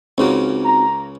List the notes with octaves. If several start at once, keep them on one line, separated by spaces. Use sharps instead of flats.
C#2 C#3 A#3 C4 D#4 F#4
A#5